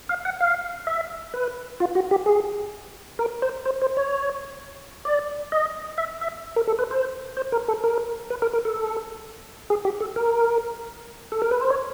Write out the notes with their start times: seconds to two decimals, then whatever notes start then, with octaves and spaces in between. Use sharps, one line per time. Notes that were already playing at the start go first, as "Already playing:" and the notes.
0.09 F5
0.25 F#5
0.41 F5
0.87 E5
1.34 B4
1.80 F4
1.95 F#4
2.11 G4
2.26 G#4
3.19 A#4
3.42 C5
3.65 C5
3.82 C5
3.97 C#5
5.05 D5
5.52 D#5
5.98 E5
6.21 E5
6.56 A#4
6.67 A4
6.79 B4
6.91 C5
7.37 C5
7.52 A#4
7.68 A4
7.84 A#4
8.30 B4
8.42 A#4
8.53 A#4
8.65 A4
9.70 G#4
9.85 G4
10.00 A4
10.16 A#4
11.32 A4
11.42 A#4
11.51 B4
11.61 C5
11.70 C#5